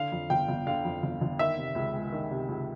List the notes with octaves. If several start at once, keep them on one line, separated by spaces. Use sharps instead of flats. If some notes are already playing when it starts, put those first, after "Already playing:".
Already playing: D3 F5
F2
G1 G5
G1
D3 F5
F2
G1
G1
D#3 E5
C3
C#2
G#3
D#3
C3
C#2